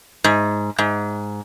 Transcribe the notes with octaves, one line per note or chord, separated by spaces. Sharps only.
G#2
G#2